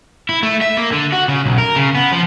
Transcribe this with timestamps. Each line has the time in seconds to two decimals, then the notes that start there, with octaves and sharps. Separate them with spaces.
0.29 E4
0.43 A3
0.61 E5
0.77 A#3
0.92 D3
1.13 F#4
1.28 C#3
1.45 B1
1.58 A#4
1.76 C#3
1.95 B3
2.12 F3